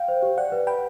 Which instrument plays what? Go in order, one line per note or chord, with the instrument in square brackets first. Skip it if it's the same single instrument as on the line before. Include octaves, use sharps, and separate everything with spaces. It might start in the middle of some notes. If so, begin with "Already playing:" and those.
Already playing: [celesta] F5 [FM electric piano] G5
[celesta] C5
G4
[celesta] D5 [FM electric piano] F#5
[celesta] B4
[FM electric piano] G5 [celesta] B5